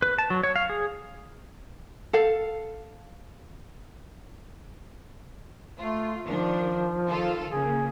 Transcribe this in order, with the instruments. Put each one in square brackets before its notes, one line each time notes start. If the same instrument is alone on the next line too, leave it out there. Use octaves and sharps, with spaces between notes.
[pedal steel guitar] B4
A5
F#3
C#5
F5
G#4
[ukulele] A4 F5
[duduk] A3 [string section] F4
[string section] D#3 D4 [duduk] F3
[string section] D#3 F4 A4
[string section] C#3 A#3 [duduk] G#4